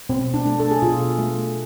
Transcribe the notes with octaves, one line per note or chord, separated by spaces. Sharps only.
B2 C4
D4
A3
A4
G#4
B2 F4
A3